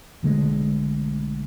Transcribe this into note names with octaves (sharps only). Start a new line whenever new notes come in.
B1 D3 G#3 A3